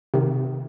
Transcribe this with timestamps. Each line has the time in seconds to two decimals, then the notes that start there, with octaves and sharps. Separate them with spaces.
0.14 C3 D#3